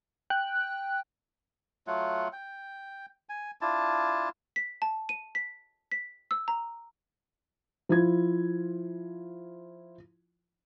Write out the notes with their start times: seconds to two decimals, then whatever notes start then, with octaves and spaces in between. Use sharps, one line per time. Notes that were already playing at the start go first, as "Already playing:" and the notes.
0.30 G5 F#6
1.87 F#3 A3 F4 F#5
2.33 G5
3.29 G#5
3.61 D4 E4 F4 A5
4.56 B6
4.82 A5
5.09 D#7
5.35 B6
5.92 B6
6.31 E6
6.48 A#5
7.89 F3 E4 F4 G#6